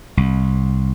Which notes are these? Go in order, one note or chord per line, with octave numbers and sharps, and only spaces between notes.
C2